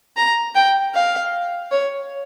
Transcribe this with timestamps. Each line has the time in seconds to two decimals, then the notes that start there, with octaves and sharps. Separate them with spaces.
0.17 A#5
0.55 G5
0.94 F5
1.71 C#5